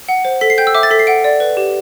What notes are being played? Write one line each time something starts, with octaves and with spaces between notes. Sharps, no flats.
F#5
C5
A4 B6
C7
G5 G6
E6
E5 D6
A6
A4 B6
C7
F#5 D7
D5
B4
G4